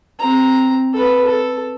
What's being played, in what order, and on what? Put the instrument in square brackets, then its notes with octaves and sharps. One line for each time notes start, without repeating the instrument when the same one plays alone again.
[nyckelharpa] C4 A#5
A4 B4
A4